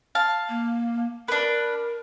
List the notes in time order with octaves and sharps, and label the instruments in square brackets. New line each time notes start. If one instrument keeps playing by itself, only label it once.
[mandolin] F5 A5
[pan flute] A#3
[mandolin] D4 B4 [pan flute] A#4